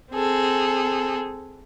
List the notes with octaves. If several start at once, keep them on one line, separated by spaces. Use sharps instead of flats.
C4 G#4 A4